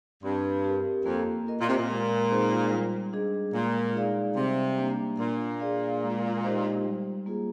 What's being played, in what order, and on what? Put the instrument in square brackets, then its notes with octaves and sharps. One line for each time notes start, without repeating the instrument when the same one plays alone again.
[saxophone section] G2 [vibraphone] C4
[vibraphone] G4 A#4
[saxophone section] F2 [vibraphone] A#3
[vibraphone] F4 A#4 D#5
[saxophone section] A#2
C3
A#2
[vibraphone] G#3
C4 D#4 G#4 C5
G3
D4 G#4 D#5
[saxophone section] A#2 [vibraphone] G#3
[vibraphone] D#4 G#4 D5 F5
[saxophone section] C3 [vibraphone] G3
[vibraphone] A#3 D4
[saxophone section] A#2 [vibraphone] D4
[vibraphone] G#4 D5 F5
G#3
D#4 G4 C5 D#5
G3
A#3 F4 G#4